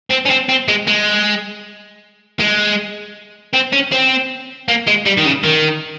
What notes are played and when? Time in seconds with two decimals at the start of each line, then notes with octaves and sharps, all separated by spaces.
0.11 C4
0.26 C#4
0.30 C4
0.49 C4
0.68 G#3
0.88 G#3
2.40 G#3
3.54 C4
3.73 C#4
3.92 C4
4.68 A#3
4.88 G#3
5.06 G3
5.18 D#3
5.25 C#3
5.45 D#3